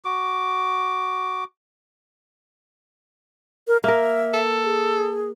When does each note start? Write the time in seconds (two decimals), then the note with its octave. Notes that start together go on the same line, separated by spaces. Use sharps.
0.05 F#4 D6
3.68 A#4
3.84 A#3 A#4 E5
4.34 A4
4.65 G#4